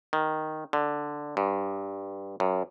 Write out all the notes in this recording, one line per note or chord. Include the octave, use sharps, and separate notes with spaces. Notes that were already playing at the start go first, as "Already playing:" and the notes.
D#3
D3
G2
F#2